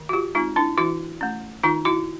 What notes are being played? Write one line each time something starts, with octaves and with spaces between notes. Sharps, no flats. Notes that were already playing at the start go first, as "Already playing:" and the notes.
Already playing: D#3
F#4
F4 G4
G#3 C4 D#4 F4
D4 E4
E3 E4 F#4
A3 C#4
D#3 D#4 F4
E4 F#4